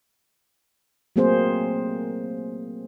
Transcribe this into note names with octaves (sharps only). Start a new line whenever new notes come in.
F#3 A3 A#3 C4 G#4 C5